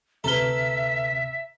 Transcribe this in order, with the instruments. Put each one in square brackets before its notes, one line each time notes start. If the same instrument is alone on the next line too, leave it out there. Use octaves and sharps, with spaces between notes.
[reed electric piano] D2 C3 F6 [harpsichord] A4 B4 [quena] E5 [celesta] A#5 G7